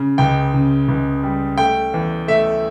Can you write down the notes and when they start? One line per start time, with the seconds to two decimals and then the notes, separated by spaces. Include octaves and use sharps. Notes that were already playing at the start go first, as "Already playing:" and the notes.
Already playing: C#3
0.18 C#2 G5
0.54 C#3
0.88 C#2
1.23 G3
1.58 A3 G5
1.94 E2
2.28 A3 E5